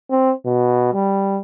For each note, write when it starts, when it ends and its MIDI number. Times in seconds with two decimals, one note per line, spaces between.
0.10 0.32 60
0.46 0.90 47
0.94 1.41 55